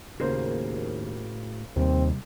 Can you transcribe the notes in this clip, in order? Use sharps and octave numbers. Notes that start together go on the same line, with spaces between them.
D#2 A2 C#3 A#3 F#4 G#4 C5
D#2 C3 G3 C4